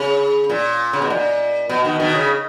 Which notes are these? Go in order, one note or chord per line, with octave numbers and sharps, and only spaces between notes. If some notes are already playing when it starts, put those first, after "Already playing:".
Already playing: C#3
A#2
C#3
B2
A#2
B2
B2 D#3
B2 D#3
C#3